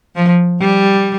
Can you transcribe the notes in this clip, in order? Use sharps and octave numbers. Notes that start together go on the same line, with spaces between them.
F3
G3